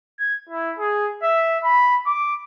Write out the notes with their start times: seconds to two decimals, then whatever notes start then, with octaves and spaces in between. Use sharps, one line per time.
0.20 G#6
0.50 E4
0.79 G#4
1.23 E5
1.64 B5
2.07 D6